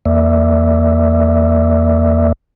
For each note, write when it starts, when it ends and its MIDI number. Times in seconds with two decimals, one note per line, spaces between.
0.05 2.32 40
0.05 2.32 58
0.05 2.32 74
0.05 2.32 76